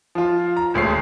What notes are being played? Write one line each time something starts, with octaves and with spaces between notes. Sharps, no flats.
F3 F4
A#5
D#1 D2 G#3 C#5 C7